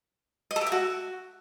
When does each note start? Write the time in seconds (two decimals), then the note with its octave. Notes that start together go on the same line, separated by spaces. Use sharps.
0.51 D#5
0.56 A4
0.61 G4
0.67 E5
0.72 F#4